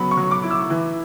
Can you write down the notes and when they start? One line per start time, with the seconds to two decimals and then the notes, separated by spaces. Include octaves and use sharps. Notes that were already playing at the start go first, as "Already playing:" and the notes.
Already playing: C#3 F#3 B3 B5
0.11 C#6
0.17 F#3
0.31 D6
0.43 E4
0.50 E6
0.70 E3